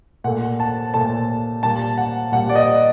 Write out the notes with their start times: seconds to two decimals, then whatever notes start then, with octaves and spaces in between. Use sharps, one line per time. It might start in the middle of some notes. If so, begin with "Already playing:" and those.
0.24 A#2 A3 F#5
0.60 A5
0.94 A#2 A3 A5
1.63 A#2 G3 A#3 A5
1.98 F#5
2.32 A#2 G3 A#3 F#5
2.49 D5
2.56 D#5